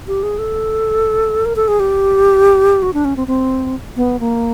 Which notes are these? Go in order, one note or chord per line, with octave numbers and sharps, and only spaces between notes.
G4
G#4
A4
A#4
A4
G#4
G4
F#4
D4
C#4
C4
C4
B3
A#3